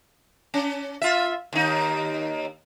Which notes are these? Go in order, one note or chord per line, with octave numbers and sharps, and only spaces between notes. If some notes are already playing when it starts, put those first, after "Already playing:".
C#4
F4 E5
D#2 D#4